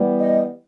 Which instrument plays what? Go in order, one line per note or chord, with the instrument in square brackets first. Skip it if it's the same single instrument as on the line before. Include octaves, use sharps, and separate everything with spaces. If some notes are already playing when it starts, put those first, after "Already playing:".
Already playing: [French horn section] E3 G3 B3
[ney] D#5